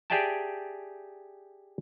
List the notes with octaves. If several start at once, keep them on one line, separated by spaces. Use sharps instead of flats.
G4 G#4 D5 E5 G5 A5